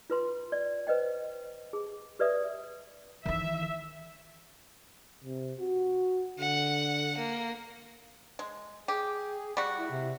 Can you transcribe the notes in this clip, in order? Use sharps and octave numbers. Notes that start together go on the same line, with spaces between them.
F4 B4 C6
D5
B4 C5 D#5 G5
G#4
G4 B4 D5 E5 D#6
D#3 E3 E5
C3
F#4
D3 F#5
A#3
G#3
G4 G#4
G3 F#4
E4
C3